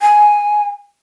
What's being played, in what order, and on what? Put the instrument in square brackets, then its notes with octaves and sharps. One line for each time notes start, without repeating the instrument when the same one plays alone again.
[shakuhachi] G#5